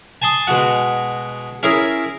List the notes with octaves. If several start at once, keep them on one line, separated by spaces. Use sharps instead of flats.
G#5 A5 C6 D#6
B2 G#3 F#4 F#5
C#4 E4 G#4 A#4